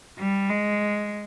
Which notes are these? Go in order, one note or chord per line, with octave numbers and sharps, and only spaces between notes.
G3
G#3